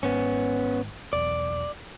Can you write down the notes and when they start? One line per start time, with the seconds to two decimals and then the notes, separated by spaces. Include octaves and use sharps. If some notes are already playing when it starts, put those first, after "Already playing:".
0.03 G#1 G#2 B3 C#4
1.13 E1 B1 E2 D5